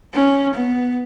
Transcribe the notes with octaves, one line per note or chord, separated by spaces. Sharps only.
C#4
B3